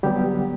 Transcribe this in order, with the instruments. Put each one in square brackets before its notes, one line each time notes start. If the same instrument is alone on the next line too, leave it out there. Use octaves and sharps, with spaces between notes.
[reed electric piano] D3 F#3 G3 B3 G4